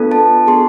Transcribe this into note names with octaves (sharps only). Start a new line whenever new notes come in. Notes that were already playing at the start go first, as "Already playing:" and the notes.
Already playing: B3 D4 F4 A4
A5
B3 F4 G#4 C6